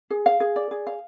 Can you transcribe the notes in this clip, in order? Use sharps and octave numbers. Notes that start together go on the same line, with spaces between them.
G#4
F5
G#4
D5
G#4
F5